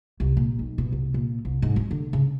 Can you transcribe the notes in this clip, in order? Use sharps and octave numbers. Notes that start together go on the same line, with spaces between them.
C2
A#2
B1
B2
C2
A#2
C2
G#2
C#4
D3
C#3